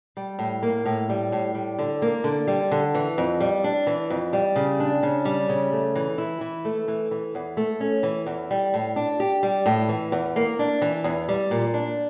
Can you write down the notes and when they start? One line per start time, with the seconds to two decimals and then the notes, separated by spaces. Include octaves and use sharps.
0.17 G3
0.39 A2
0.63 A#3
0.86 A2
1.09 G3
1.32 A2
1.55 G3
1.79 D3
2.02 A#3
2.24 D3
2.48 G3
2.71 D3
2.95 E3
3.18 F2
3.40 G3
3.64 D4
3.87 E3
4.10 F2
4.33 G3
4.56 C#3
4.80 D4
5.03 C#3
5.25 G3
5.49 C#3
5.73 A3
5.96 E3
6.18 E4
6.41 E3
6.65 A3
6.88 E3
7.11 E3
7.35 E2
7.57 A3
7.80 C#4
8.03 E3
8.27 E2
8.51 G3
8.74 A2
8.96 D4
9.20 G4
9.43 G3
9.66 A2
9.88 E3
10.12 E2
10.36 A#3
10.59 D4
10.82 E3
11.04 E2
11.29 G3
11.51 A#2
11.74 D4